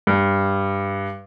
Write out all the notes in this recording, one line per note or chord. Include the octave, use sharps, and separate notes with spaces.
G2